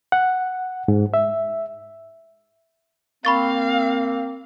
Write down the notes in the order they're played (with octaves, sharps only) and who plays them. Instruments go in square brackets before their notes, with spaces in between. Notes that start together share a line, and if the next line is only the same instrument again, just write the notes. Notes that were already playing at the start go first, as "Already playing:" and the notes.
[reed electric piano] F#5
G#2
E5
[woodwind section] A#3 C4 [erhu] F5 [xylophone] B5 C#6 A6